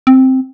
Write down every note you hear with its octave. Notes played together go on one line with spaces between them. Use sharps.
C4